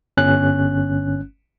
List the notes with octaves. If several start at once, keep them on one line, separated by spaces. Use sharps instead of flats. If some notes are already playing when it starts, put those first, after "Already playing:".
G1 C#4 F#6